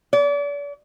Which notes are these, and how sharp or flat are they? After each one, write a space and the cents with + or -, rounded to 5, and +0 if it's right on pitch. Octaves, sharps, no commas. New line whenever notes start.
D5 -40